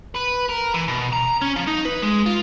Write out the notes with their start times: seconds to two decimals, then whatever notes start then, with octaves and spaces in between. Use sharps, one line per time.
0.15 B4
0.49 A#4
0.74 E3
0.88 B2
1.13 A#5
1.42 C#4
1.56 F3
1.68 D#4
1.86 B4
2.03 G#3
2.26 F4